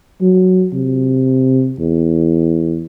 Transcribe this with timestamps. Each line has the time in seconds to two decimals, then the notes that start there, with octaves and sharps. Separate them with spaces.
0.21 F#3
0.74 C3
1.79 E2